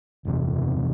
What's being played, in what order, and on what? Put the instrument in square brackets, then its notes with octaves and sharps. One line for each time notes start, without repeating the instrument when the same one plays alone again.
[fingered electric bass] F#1 E2 C3